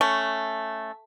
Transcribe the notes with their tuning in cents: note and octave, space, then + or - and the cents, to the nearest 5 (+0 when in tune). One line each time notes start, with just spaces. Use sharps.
A3 +0 C#4 +0 C#6 +0